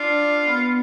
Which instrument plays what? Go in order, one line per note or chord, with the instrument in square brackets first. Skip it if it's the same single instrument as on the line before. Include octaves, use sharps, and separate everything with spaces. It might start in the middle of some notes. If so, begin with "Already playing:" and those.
Already playing: [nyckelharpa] D4 [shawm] F4
[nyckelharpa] B3